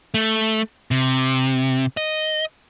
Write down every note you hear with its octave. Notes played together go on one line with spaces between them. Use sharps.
A3
C3
D#5